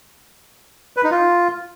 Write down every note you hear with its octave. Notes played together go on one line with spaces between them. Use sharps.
B4
D#4
F4